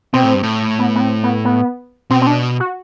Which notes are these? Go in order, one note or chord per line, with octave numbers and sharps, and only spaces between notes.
B2 C4
A2
G2
A2
B3
B3
C4
B3
B3
B2 C4
C4
D4
F#4